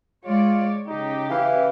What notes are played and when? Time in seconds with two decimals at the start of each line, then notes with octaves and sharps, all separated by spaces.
0.25 G#3 F4 C#5 D5
0.87 C#3 D#4 G4
1.30 E3 F5